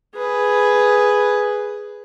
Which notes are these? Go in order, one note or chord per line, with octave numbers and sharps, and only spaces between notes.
G#4 B4